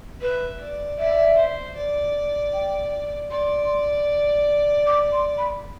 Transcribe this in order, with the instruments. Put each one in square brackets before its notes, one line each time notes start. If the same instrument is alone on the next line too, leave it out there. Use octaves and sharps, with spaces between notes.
[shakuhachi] B4 [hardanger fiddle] E5
[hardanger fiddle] D5
[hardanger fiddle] D5 [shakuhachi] E5
[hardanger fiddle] C5
D5
[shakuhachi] G5
[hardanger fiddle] D5 [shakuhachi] C6
[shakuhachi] D6
C6
B5